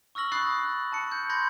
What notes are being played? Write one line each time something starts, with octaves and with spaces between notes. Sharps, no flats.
C#6 E6 F6 A#6 F#7
B5 D#6 F#6 A6 C7
F#6
A5 C#7
G6
B5 C6 G6 G#6 A#6 C#7